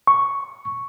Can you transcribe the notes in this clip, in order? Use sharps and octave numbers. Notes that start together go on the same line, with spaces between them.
C#6